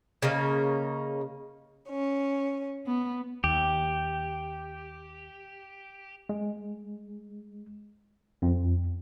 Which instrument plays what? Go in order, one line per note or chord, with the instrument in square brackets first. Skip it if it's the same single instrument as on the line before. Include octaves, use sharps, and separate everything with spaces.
[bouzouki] C#3 A#3 D#4
[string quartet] C#4
B3
[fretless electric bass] D#2 [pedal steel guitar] G4
[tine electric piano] G#3
F2